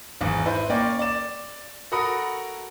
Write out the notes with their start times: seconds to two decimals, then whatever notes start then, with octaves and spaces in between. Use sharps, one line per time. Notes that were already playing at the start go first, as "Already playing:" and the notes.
0.21 G#1 E2
0.46 E4 B4 C5
0.70 A#3 C#4 D5 G5
0.99 D5 E7
1.92 F#4 A4 A#4 F#5 B5 D#6